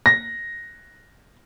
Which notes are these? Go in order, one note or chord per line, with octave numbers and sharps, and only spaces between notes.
A#6